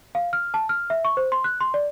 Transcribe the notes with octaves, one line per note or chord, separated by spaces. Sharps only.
F5
F6
A5
F6
E5
C#6
C5
C6
F#6
C6
D5